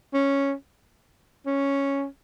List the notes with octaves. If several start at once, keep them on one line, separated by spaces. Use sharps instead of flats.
C#4
C#4